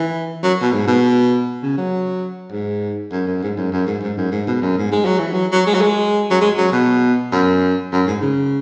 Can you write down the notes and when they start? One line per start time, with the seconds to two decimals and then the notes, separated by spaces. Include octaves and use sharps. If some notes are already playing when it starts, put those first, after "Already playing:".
Already playing: E3
0.43 F#3
0.62 B2
0.73 G#2
0.88 B2
1.63 C#3
1.77 F#3
2.52 G#2
3.12 F#2
3.27 F#2
3.43 G#2
3.57 F#2
3.72 F#2
3.87 G#2
4.03 G#2
4.18 F#2
4.32 G#2
4.47 B2
4.62 F#2
4.78 G#2
4.92 G#3
5.06 F#3
5.19 E3
5.33 F#3
5.52 F#3
5.67 G#3
5.75 F#3
5.81 G#3
6.31 F#3
6.41 G#3
6.58 F#3
6.72 B2
7.32 F#2
7.92 F#2
8.07 G#2
8.22 C#3